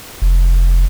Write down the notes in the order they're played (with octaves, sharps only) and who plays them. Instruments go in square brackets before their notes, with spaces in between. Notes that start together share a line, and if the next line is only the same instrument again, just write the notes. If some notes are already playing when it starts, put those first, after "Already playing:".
[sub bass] F1